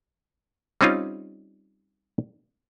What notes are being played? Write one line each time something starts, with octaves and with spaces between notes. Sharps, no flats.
G3 C4 C#4 D#4 F4